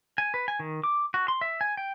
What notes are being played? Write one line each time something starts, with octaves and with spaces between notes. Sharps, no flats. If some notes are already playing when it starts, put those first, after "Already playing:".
G#5
B4
G#5
D#3
D6
F#4
C6
E5
G#5
G5